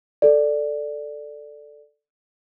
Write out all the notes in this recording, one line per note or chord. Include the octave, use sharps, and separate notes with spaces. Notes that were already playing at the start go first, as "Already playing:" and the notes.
A4 D5